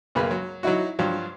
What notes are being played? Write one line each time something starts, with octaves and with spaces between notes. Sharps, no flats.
B1 F#2 C#3 A#3 B4 B5
F#3
F#3 D#4 E4 F#4
G2 F3 F#3